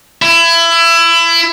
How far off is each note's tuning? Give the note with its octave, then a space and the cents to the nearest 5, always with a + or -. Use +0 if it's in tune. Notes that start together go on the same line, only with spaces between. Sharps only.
E4 +25